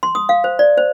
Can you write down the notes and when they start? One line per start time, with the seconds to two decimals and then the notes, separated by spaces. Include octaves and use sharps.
0.03 C6
0.15 D#6
0.29 F5
0.44 C5
0.59 D5
0.78 C5